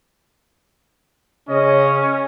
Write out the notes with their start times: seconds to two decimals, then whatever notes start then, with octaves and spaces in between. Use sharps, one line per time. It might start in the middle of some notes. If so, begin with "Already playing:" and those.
1.49 C#3 C#4 C#5 D#5